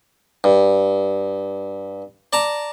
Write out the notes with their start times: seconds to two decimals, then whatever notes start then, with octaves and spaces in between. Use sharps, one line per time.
0.44 G2
2.33 D5 A5 A#5